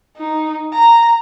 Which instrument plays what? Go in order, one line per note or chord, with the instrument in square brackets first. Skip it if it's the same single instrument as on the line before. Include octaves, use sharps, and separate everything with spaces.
[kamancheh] D#4
A#5